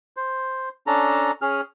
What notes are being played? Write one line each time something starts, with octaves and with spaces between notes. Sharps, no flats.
C5
C#4 D4 A4 A#5
C#4 G#4 F6